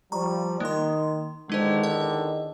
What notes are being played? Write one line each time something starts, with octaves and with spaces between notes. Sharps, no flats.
F3 G3 A#5 C#6
D#3 A#3 C6
E2 D3 D#3 G#3 D#4 C5
D#5